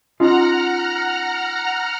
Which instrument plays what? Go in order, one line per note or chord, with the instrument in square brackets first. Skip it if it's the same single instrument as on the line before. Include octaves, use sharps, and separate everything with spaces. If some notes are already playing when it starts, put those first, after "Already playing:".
[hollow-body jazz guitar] C#4 D#4 F4 [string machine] F#5 A#5 F6